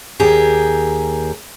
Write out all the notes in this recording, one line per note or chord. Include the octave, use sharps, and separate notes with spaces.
D#2 G4 G#4 A#4